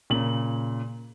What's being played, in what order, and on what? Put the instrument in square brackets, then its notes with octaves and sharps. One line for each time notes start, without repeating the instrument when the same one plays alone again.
[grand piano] A#2 C#3 F#7